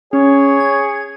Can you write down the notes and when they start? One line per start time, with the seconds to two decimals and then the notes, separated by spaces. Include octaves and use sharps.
0.13 C#4 G#4 C#5
0.60 G#6